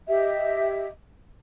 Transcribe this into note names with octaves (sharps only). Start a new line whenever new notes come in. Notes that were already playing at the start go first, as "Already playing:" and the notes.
G4 D#5 E5